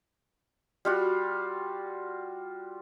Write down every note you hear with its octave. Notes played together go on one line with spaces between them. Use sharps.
G3 F4 F#4